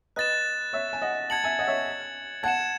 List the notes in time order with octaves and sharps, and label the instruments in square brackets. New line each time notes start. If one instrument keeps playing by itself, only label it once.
[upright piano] B4 D#5 [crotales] F#6 A6 E7
[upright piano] C#5 E5
G#5
D#5 F#5
[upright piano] F#5 A5 [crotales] G#6 C#7 F#7
[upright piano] E5 G#5
D#5 F#5
C#5 E5
[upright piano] F#5 A5 [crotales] G#6 C#7 E7